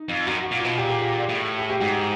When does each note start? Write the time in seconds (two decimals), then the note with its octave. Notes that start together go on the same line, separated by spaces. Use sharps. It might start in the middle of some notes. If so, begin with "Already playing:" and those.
Already playing: D#4
0.09 F2
0.26 F#2 F#4
0.43 F#4
0.51 A#2
0.60 B2 F4
0.78 A#2 G4
0.89 G#4
0.99 G4
1.29 A2
1.59 G#4
1.70 G4
1.80 G#2 F#4